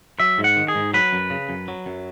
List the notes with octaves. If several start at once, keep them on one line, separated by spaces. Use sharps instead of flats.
F#3 E5
G#2
F#5
D#3
G#4
G#2
F#3 B4
F#2
C#3
F#2
F#3
F#2